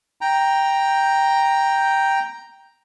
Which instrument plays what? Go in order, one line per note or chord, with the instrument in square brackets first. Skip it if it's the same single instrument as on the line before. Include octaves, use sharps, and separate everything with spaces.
[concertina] G5 A#5